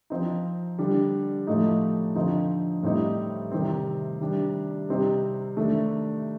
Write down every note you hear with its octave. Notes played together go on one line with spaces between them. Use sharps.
F3 C4 D#4
D3 G3 D4
A2 F3 A3 D#4
D3 F3 C4 D#4
A2 G3 C4 D#4
C3 D#3 G3 C4
D#3 G3 D4
C3 G3 C4 D#4
D#3 A3 D4